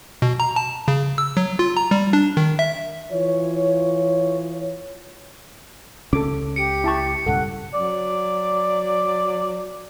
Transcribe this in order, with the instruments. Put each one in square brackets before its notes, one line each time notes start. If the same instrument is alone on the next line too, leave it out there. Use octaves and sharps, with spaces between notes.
[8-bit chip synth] B2
A#5
A5
C#3
E6
F#3
F4
A#5
G3
D4
D#3
E5
[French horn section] E3 F4 C#5
[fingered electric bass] C#2 C#3 C#4 [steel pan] A4 D6
[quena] G4 [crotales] C#7 D7
[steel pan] E4 A5 C#6
[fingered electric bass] B1 G2 C#3 [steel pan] A4 [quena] F#5
[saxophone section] F#3 D5